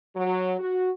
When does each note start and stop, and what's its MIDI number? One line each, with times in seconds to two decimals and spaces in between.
0.14 0.53 54
0.58 0.90 66